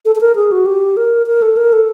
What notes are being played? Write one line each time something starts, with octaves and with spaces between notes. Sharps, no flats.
A4
A4
A#4
G#4
F#4
G4
A#4
A#4
A4
A#4
A4